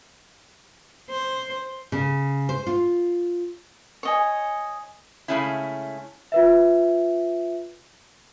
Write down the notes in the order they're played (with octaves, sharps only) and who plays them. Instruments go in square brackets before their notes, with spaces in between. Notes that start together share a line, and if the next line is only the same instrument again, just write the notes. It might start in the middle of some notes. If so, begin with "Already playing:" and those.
[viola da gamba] C5
[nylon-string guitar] C#3
C5
F4
[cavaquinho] C#5 D#5 G#5
[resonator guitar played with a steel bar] C#3 G#3 A3 C#4 E4
[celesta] F4 B4 E5